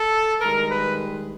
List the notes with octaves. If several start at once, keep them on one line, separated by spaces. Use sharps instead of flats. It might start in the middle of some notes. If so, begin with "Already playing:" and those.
Already playing: A4
G2 D#3 G#3 A#4
B4